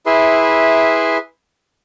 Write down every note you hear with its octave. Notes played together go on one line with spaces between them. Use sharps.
E4 G#4 B4 E5 C6